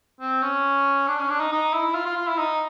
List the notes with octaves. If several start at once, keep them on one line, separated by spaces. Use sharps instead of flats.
C4
C#4
D4
C#4
D4
D#4
D#4
E4
F4
F4
F4
E4
D#4